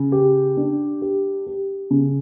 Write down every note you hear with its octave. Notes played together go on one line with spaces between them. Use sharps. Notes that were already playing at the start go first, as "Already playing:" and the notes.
Already playing: C#3
G4
D4
G4
G4
C#3